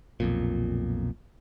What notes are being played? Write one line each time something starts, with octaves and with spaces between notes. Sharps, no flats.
B1 F2 A#2